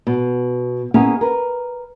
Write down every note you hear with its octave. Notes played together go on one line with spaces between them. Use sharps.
B2
A#3 B3 C#4 E4 G#4 B4
A#4 B4